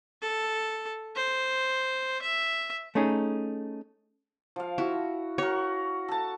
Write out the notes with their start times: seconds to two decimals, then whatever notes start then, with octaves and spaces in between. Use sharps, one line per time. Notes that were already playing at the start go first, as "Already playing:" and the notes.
0.22 A4
1.16 C5
2.22 E5
2.95 A3 C#4 D#4 G#4
4.56 F3 F5
4.78 E4 F#4
5.38 F#4 A#4 C#5
6.08 A4 A5